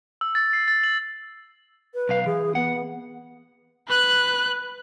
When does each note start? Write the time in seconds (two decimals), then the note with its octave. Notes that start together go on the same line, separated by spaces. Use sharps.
0.21 E6
0.35 A6
0.53 C7
0.68 A6
0.84 F#7
1.94 B4
2.09 B1 F5
2.26 E3 G#4
2.55 B3 F#5
3.88 B4 F#6